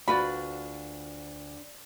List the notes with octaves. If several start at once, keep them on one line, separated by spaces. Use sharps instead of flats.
D2 D4 F4 F#4 B4 D5 B5